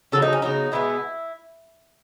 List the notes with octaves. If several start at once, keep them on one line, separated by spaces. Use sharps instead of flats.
C#3 F#3 B3 A4
D#4
C#4
C#3 F#3 B3 D#4
B2 G#3 B3 E4